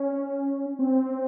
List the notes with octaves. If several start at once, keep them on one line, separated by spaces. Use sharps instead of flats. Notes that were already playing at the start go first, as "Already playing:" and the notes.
Already playing: C#4
C4